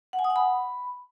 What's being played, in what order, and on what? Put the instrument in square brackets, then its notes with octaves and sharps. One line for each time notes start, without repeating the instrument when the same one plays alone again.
[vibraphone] F#5
G#5
D#6
F#5
B5